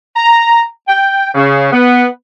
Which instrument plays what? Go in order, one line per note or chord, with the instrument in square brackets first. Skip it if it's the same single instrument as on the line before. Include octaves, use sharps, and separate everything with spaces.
[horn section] A#5
G5
C#3
B3